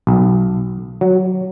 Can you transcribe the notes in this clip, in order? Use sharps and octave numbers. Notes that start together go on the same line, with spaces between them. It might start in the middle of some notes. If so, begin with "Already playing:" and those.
B1
F#3